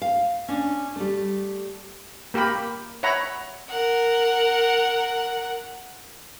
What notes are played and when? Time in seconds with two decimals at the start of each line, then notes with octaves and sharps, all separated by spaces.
0.02 F5
0.48 C#4 D4
0.96 G3 A3
2.34 A#3 G4 A#4 G5 B5
3.03 C#5 E5 F#5 A#5 B5
3.69 A#4 F#5